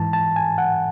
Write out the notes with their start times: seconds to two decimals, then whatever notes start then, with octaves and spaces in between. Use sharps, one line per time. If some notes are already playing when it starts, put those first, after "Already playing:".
Already playing: G#2 E3 A5
0.13 A5
0.36 G#5
0.58 F#5